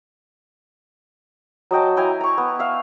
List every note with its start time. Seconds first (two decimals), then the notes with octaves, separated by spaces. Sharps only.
1.71 F#3 D#5 G5 A5
1.96 E4 G5 G#5 A#5
2.21 A#5 C#6
2.38 B3
2.59 E5 F5